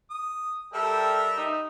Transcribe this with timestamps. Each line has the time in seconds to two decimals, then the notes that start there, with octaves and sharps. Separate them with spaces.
0.10 D#6
0.73 G3 A4 A#4 E5 G5
1.37 D#4